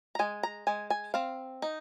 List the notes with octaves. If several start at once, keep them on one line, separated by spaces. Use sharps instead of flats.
A#5
G#3 G#5
A#5
G#3 G#5
G#5
C4 F5
D#4